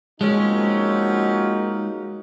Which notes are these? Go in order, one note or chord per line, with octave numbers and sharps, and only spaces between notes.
F3 G#3 A#3 C4 C#4 D#4 F#4